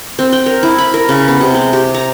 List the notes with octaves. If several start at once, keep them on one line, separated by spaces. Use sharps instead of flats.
C4
G5
A#4
E4
B5
A#4
C#3
B3
C3
G#3
G4
A#5